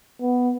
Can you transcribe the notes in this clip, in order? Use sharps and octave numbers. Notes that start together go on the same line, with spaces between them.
B3